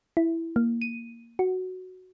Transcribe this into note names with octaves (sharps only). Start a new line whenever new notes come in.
E4
A#3
D#7
F#4